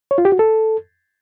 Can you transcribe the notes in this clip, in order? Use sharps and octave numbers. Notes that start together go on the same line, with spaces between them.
C#5
F4
G4
F#4
A4